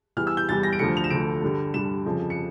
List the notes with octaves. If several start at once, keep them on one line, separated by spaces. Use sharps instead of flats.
E2 E3 G3 F6
E6
G6
E2 E3 G3 A6
A#6
D7
D2 D3 F3 C#7
F7
E7
D2 D3 F3 D7
G2 D3 G3
G2 D3 G3 E7
F2 C#3 F3
C#7